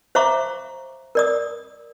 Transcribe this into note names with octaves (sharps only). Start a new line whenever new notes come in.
C5 E5 F5 A#5 C#6 D6
A#4 D5 D#6